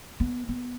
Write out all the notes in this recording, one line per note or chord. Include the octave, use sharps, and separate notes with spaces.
B3
B3